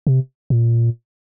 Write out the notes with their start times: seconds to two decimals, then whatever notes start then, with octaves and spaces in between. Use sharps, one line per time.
0.07 C3
0.50 A#2